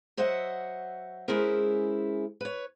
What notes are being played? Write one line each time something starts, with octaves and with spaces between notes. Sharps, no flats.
F#3 C5 D#5 E5 F#5
G#3 C#4 E4 G#4 A#4 C5
B4 C#5